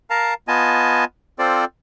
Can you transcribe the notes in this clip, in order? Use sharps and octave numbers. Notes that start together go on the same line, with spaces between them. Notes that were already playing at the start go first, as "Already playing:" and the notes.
A#4 F5 A5 A#5
B3 F4 D#5 G#5 A5
C4 F4 A4 C5 D5